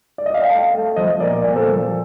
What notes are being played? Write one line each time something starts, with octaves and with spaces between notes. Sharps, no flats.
D5
D#5
F5
G5
A3 F5 A5
A3
F3 C5 D#5
A#2 A#4 D5
A#2
A4 C5
F3